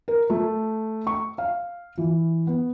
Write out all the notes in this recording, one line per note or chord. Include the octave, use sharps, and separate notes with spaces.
A#4
A3
C#6
F5
E3
B3